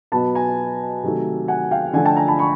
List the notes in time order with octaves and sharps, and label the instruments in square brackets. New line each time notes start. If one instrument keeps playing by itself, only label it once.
[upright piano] B2 F#3 B3 A5 B5
G#5 A#5
C3 D#3 F#3 A3
F#5 G#5
F5 G5
D3 F3 A3 F#5 G#5
G5 A5
G#5 A#5
A5 B5
B5 C#6